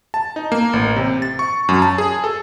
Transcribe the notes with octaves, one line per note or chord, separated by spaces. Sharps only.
A5
D#4
A#3
A1
C3
A6
C#6
F#2
A5
G#4
A4